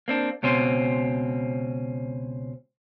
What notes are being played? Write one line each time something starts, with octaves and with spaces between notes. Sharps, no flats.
A#3 C4 D4
C#2 B2 C4 C#4 C5